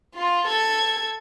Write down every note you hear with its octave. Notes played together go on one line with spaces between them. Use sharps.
F4
A4 G#6